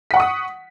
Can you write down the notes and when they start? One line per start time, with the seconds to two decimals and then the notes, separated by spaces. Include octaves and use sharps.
0.11 B6
0.14 F#5
0.17 C#6
0.20 D#6